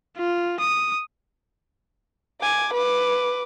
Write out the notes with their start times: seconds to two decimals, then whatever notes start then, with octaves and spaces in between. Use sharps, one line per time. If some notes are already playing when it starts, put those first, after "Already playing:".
0.18 F4
0.60 D#6
2.41 G#5 D6
2.74 B4 D6